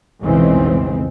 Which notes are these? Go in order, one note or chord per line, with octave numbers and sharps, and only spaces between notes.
F1 B1 C#3 E3 G#3 C4